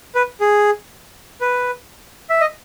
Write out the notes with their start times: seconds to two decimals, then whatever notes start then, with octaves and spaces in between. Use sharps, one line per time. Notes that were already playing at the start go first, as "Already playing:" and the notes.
0.15 B4
0.40 G#4
1.41 B4
2.30 E5
2.41 D#5